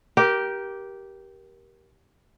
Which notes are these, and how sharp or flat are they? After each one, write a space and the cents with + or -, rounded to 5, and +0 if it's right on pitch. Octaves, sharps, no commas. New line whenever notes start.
G4 -10 A#4 +20 G5 +0